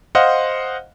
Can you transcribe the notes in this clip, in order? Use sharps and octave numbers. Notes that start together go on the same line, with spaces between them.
C5 D#5 F5 F#5